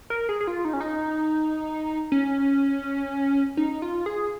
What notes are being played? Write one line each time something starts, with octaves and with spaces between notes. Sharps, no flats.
A#4
G#4
G#4
F4
D#4
C#4
D#4
C#4
D#4
F4
G#4